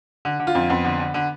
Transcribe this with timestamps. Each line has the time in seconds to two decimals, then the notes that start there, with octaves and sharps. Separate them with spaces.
0.25 D3
0.40 D3
0.47 F4
0.55 F2
0.69 F2 B3
0.85 D3
1.00 D3
1.14 D3